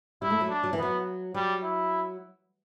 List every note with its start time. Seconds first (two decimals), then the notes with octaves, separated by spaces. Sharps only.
0.22 G3 E4
0.30 A3
0.41 F#3
0.49 D4
0.64 F#3
0.73 E3
0.78 F#3 B3
1.34 F#3 G3
1.62 E4